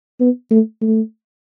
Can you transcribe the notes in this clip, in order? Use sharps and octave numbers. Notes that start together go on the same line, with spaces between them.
B3
A3
A3